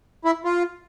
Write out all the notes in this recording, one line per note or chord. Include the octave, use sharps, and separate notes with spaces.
E4
F4